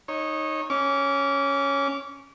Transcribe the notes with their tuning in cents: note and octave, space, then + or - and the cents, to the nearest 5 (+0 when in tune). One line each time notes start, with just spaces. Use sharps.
D#4 +0 C#5 -20
C#4 +0 D6 -30